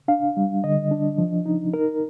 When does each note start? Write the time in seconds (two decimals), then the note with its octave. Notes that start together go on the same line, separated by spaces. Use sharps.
0.08 D4 F5
0.37 G3
0.64 D3 D#5
0.91 D4
1.18 F3
1.46 D#4
1.73 D#4 A#4